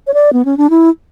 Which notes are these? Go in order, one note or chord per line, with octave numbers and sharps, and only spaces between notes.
C#5
D5
B3
C#4
D4
E4